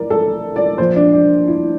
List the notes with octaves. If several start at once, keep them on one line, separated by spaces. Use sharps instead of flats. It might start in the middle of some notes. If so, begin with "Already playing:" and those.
Already playing: E3 A#4 D5
A4
D5
A#2 F3 C5
D4
D4
E4